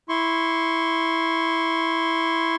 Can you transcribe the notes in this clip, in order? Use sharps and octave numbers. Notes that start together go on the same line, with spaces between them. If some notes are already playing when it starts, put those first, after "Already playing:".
E4 C6 C#6